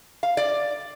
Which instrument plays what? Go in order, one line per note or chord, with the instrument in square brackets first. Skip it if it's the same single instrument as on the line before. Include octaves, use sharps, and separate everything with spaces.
[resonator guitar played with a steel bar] F5
D5